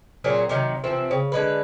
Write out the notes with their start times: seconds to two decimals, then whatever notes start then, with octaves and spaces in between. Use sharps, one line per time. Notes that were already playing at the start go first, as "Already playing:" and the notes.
0.24 A#2 F#3 C4 G#4
0.49 C3 D#3 F#3
0.84 C3 E3 F3 C4
1.11 C#3
1.32 D3 G#3 B4